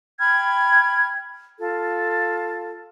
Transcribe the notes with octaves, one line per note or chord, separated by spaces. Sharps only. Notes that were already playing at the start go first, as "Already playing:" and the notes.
G5 B5 F6 G#6
F4 A4